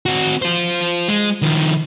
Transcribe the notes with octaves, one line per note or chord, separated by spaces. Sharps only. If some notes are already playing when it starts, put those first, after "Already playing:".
C4 F#4
F4 C5
G#3
D#3 F3